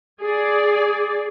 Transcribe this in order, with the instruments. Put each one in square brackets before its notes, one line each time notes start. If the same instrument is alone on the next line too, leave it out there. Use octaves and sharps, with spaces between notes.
[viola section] G#4 D5